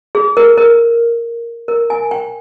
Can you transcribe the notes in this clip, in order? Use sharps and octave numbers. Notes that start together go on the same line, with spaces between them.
G#4
A#4
A#4
A#4
G#5
G5